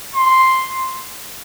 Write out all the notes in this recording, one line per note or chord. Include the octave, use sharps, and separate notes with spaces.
C6